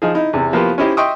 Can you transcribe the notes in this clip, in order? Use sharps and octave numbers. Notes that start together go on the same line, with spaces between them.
F3 D#4 G#4
D#4 E4
E2 C3
F3 A#3 B3 E4 F4 G4
C#4 D#4 E4 G4 C5 D#5
D#5 E5 G5 C6 C#6 D#6